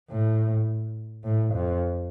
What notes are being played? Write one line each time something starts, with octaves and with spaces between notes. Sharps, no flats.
A2
A2
F2